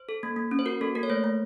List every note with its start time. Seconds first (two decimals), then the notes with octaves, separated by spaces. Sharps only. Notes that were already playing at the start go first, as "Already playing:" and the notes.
Already playing: C5
0.09 A4
0.23 A#3
0.36 A#3
0.51 C#4
0.59 C5
0.66 F#4 A#4
0.81 A#3 A4
0.95 A#3 A#4
1.03 C#5
1.10 A3 C5
1.24 A3